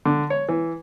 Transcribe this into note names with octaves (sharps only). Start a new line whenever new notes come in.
D3
C#5
E3